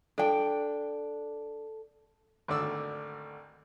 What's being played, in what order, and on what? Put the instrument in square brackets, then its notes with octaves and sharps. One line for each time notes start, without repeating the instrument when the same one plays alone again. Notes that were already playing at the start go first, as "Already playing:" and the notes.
[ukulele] D4 G5 [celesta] A4 A5
[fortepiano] G#1 D2 D3 D5 E6